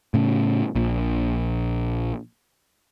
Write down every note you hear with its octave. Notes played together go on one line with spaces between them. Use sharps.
A2 C#3
A#1 A#2